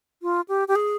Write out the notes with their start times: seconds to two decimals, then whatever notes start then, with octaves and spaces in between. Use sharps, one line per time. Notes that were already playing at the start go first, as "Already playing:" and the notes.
0.22 F4
0.48 G4
0.68 G4
0.75 G#4